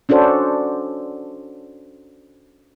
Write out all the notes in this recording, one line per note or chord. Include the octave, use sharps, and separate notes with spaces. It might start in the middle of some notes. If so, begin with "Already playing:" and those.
C#4 D4 F#4 A4 C5